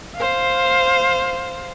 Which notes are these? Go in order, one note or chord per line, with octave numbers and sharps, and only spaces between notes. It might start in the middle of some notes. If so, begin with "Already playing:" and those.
C5 F5